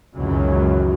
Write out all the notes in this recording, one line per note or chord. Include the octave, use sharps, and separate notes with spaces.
C#2 F#2 D#3 E3 F#3